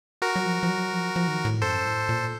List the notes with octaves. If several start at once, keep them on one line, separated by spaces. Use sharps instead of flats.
F#4 A#4
F#3
F3
F3
F#3
F3
F3
D#3
A2
F#2 A4 C5
A2
A#2